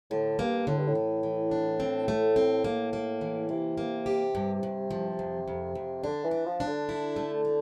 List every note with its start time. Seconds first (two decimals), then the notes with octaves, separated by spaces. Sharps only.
0.11 A2 D3
0.38 G2 A#3
0.67 A2 D3
0.77 G2
0.87 A2
0.95 E3
1.23 E3
1.51 D4
1.80 C4
2.08 A3
2.36 C4
2.64 A2 A#3
2.93 A#3
3.21 E3
3.49 C3 A#3
3.78 A#3
4.06 G4
4.35 G2
4.63 G2
4.91 F3
5.19 F2
5.48 F2
5.75 F2
6.04 D3 D4
6.24 E3
6.31 D4
6.46 F3
6.60 D4
6.67 D3
6.89 E4
7.16 A3
7.45 A3